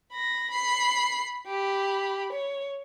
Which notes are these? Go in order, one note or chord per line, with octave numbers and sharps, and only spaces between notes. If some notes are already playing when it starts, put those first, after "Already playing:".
B5 A#6
B5 C7
G4 B5
C#5